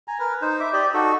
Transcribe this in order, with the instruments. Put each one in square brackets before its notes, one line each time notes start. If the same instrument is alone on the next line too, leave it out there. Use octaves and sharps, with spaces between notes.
[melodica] G#5 A#5
A#4 B4
D#4 C5
E5 D6
G4 D5 D#5
D#4 F#4 A4